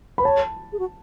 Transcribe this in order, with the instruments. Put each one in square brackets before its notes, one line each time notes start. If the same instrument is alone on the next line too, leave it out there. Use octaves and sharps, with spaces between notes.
[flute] B4 [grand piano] B5
[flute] C#5 [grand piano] A5
[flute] G#4
F#4